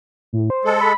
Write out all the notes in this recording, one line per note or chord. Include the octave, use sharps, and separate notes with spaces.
A2
C5
G#3 A4
B5